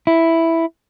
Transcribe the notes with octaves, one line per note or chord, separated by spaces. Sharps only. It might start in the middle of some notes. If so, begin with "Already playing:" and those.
E4